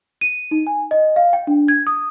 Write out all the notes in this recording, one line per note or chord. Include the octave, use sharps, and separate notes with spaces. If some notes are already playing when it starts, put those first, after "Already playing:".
D#7
D#4
G#5
D#5
F5
G5
D4
G#6
D#6